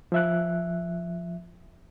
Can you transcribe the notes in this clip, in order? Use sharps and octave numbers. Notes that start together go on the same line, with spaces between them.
F3 E5 F#6